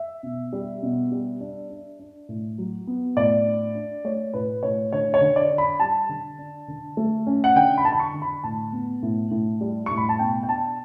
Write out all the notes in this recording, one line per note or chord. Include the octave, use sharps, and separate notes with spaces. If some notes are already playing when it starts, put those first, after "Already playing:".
Already playing: E5
B2
G3
B2
G3
D4
D4
D4
A2
F#3
B3
A2 D5
D4
D4
A3 C#5
A2 B4
A2 C#5
D3 C#5
C#5
D3
D5
D4
B5
G3 A5
D3
D4
D3
A3
C#4
F#5
D3 G5
B5
D3 A5
B5
C#6
D3
B5
A2 A5
B3
A2
A2
G3
A2 C#6
B5
A5
B2 G5
G5
D4 A5